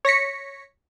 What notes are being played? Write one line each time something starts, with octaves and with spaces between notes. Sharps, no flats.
C#5 A#6 B6 C#7